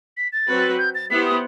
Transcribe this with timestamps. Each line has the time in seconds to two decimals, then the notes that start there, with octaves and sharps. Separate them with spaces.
0.17 B6
0.32 A6
0.48 F#3 C4 F#4 B4
0.78 G6
0.95 A6
1.10 B3 E4 G4 C5 B6
1.26 D#6